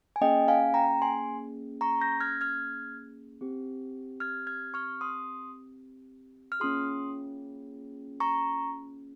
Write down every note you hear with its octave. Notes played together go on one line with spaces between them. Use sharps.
G#5
A#3 C#4 G#4 D#5 G5
F5 G#5
G5 A#5
G#5 C6
A#5 C#6
G6 A#6
F6 G#6
F6 G#6
C4 G4
F6 G#6
F6 G#6
C#6 F6
C6 D#6
F6
A#3 C#4 F4 G#4 C6 D#6
A#5 C#6